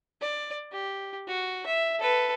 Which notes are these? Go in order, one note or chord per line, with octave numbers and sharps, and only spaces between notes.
D5
G4
F#4
E5
A4 B4